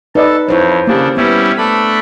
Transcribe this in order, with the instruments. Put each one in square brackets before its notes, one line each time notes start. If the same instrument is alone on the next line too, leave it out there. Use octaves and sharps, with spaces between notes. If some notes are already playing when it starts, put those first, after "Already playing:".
[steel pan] D#4 D5 D#5 [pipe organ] A4 [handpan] B4
[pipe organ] F2 [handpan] E4 C5 C#5
[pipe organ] C#3 D4 [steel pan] A#3 G4
[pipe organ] G3 C#4 E4 [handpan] B3
[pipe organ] A3 D4 B5